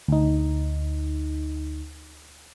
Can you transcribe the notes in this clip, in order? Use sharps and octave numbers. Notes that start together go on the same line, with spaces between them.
D2 D#4